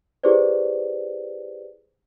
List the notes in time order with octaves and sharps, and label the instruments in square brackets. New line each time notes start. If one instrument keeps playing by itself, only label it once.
[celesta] E4 G4 G#4 B4 C5 D5